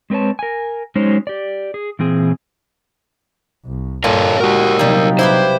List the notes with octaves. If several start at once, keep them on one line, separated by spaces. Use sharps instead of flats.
G#3 C4 B4 C#5 A5
A#4 G#5
F#3 G#3 C#4 D#4 C5 C#5
G4 D5
G#4
A#2 E3 C4 G#4
C2
G2 A#2 A4 A#4 C#5 F5
G#3 F#4 G4 A#4
C3 F#3 G3 A#3 D#4
E4 G4 B4 C5